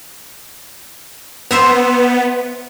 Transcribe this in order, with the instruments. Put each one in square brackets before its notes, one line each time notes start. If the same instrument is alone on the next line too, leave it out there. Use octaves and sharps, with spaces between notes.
[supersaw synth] B3 [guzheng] C5 E5 A#5